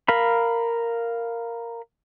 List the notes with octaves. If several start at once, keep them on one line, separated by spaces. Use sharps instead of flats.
A#4 F5 B5